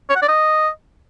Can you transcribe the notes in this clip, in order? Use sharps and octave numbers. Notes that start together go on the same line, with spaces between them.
C#5
F#5
D5
D#5